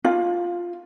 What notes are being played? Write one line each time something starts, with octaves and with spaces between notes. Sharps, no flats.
F4